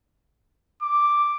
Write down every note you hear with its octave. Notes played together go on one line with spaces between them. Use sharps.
D6